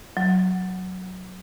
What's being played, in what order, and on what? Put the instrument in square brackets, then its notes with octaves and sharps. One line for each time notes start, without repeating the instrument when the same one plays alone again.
[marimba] F#3